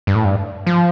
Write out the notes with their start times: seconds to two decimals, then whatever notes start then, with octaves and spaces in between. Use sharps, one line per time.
0.07 G2
0.15 A2
0.25 G2
0.66 F3